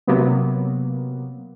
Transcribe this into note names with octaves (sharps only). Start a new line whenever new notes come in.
C3 F#3 A#3 B3